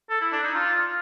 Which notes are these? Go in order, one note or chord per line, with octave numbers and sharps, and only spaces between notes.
A4
E4
D4
D#4
F4